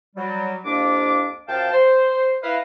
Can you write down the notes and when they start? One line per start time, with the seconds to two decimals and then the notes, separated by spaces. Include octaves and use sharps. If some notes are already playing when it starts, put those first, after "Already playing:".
0.16 F#3 G3
0.65 C2 F2 A#3 D4 D6
1.48 F#2 F3 F5 G5 A5
1.71 C5
2.43 E4 B4 D#5 F5